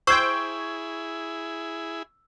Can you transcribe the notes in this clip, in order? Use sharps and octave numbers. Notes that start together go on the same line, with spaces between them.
E4 G#4 C5 G5 C#6 E6 G#6